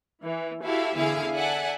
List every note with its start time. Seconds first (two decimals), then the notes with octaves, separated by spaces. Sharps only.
0.24 E3
0.64 E4 F#4 G4 A4 E5 F5
0.96 E2 D3 E4 G#4 F5
1.35 A4 D5 E5 F#5 G#5